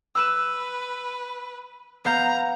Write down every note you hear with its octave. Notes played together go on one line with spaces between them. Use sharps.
B4 E6 F#6 E7
B3 F5 A#5 G6